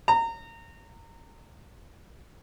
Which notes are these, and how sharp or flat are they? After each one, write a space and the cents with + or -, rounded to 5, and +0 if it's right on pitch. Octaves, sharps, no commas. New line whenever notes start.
A#5 -25